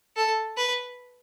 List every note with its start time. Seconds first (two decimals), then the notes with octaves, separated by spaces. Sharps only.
0.16 A4
0.58 B4